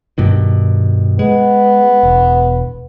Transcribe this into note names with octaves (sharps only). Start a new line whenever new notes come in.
G2 B2 D#3
G#3 B3
E1